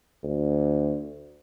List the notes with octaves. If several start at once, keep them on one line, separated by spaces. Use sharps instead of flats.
D2